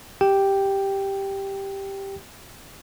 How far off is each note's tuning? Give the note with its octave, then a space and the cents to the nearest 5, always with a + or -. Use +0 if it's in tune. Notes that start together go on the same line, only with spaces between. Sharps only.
G4 +0 G5 +0